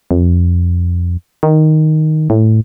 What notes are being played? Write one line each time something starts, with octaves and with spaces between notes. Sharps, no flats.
F2
D#3
A2